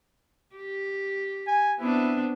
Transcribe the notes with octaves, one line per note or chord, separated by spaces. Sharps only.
G4
G#5
B3 C4 D4 E4